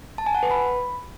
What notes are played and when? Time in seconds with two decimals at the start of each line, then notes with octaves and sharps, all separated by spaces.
0.18 A5
0.26 G#5
0.35 F#5
0.43 B4
0.51 B5